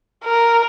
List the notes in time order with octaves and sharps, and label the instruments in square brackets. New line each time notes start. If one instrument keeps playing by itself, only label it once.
[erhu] A#4